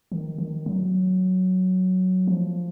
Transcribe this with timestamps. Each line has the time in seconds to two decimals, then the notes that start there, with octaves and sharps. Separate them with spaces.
0.12 D#3
0.38 D#3
0.66 F#3
2.27 F3